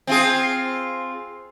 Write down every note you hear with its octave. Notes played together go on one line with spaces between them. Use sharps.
C4 F4 G#4